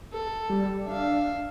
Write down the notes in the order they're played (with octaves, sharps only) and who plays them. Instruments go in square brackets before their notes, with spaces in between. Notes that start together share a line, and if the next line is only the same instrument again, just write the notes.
[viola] A4
[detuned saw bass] G3
[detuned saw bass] D4 [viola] E5 F5